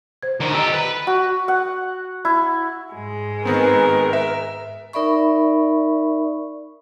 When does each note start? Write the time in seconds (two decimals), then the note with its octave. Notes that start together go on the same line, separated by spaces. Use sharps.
0.23 C5 G#6
0.41 D2 D#3
0.54 G4 A4 D#5 A#5 E6
0.74 B4
1.07 F#4
1.48 F#5
2.25 E4
2.95 G#2 G#3
3.45 D#3 B3 C4 A#4 B4
4.13 E5
4.93 D#4 A#4 D5 E5 B5 C#6